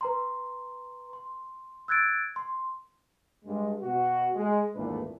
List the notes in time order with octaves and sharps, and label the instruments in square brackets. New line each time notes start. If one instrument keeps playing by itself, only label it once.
[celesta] B4 A#5 C6
C6
E6 F#6 G#6 A6 D7
C6
[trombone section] G2 G#3
B2 F#4
G#3
G#1 E2 A#2 A3 D4 B4